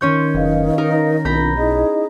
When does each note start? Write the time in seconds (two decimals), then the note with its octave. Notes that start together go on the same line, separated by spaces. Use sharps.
0.01 D#3 C#4 C#5 C6 G6
0.35 F#1 B4 D#5 F5
0.78 D#4 A#4
1.25 B1 C4 D4 F4 A#5 B5 G6
1.57 D#4 E4 G#4 D#5